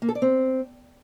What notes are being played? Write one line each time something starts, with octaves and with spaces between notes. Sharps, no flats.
A#3
A4
D5
C4